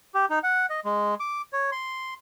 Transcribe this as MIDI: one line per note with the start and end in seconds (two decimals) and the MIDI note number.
0.14 0.26 67
0.30 0.39 63
0.43 0.66 78
0.70 0.80 75
0.85 1.15 56
1.20 1.42 86
1.53 1.70 73
1.72 2.14 84